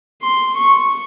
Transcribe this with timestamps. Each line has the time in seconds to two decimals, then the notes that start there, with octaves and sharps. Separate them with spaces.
0.23 C6
0.56 C#6